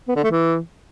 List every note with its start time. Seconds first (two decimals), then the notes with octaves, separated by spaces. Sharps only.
0.08 B3
0.16 D3
0.23 A3
0.31 E3